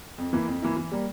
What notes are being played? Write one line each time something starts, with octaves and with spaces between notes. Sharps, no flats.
F2
E3 A#3 E4
F2
E3 A#3 E4
E3
G3 A#3